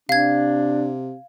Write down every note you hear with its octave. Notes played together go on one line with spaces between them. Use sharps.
C3 D4 F5 G#6